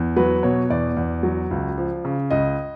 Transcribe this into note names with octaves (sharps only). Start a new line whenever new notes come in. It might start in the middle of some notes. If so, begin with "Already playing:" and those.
Already playing: E2
F#3 B4
B2 C#5
E2 D5
E2
F#3
C#2
F3
C#3
C#2 D#5